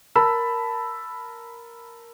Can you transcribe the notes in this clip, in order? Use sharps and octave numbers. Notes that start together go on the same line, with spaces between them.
A#4 A5 B5 E6